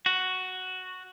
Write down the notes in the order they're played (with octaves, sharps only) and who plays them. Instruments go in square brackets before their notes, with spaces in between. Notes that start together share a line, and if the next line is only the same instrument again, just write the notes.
[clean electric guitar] F#4